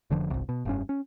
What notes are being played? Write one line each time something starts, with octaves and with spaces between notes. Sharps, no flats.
F1 D3 F3
G1 C2
B2
F1 G2 C#4
C#4